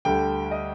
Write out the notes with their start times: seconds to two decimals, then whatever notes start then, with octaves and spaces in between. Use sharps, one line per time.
0.05 D2 D3 G3 G5
0.51 D#5